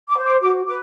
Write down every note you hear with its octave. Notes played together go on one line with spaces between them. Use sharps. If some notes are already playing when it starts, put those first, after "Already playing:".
D6
C5
D6
F#4 D6
B4 D6